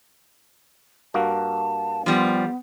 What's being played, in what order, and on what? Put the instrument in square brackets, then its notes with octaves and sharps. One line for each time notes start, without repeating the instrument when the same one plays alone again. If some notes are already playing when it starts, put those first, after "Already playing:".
[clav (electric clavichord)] G2 A#3 F#4 [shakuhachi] A5
[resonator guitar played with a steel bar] F3 G3 [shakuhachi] B3